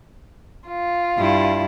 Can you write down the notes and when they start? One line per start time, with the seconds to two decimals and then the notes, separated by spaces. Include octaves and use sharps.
0.68 F4
1.18 G2 E4